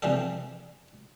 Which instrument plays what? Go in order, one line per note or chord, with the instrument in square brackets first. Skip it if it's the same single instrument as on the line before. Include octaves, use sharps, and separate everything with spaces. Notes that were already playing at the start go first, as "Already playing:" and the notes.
[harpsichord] C3 E3 F3 G3 G#4 A4